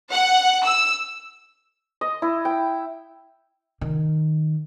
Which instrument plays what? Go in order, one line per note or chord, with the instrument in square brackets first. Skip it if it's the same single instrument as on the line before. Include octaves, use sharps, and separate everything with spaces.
[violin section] F#5
E6
[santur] D#5
E4
G5
[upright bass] D#3